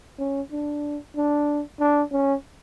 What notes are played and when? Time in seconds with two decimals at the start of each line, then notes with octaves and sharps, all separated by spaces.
0.19 C#4
0.52 D4
1.16 D4
1.80 D4
2.12 C#4